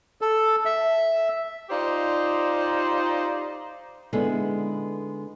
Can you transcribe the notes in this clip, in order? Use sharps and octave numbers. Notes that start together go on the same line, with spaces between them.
A4
E5
D#4 F4 G4 C5 D5
D3 G#3 B3 D#4 E4 A4